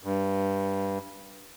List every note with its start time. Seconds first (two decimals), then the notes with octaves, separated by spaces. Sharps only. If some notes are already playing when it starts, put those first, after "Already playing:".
0.03 G2